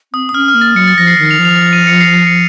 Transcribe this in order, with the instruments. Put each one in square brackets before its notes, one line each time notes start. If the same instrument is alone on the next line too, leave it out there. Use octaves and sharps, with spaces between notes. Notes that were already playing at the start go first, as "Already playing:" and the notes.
[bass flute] C4 [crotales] D#6
[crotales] D#6
[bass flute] C#4 [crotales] F6
[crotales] F6
[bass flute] A#3
[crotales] A6
[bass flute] F#3 [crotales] C#7
[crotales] A6
[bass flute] F3 [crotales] A#6
[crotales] C7
[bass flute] D#3 [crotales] C#7
[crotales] F7
[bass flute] F3
[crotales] F7
D#7
C#7
C7
C#7